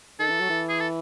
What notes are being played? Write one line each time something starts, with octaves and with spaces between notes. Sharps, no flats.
D#3 A4
E3
F#3
E3
G#4
A4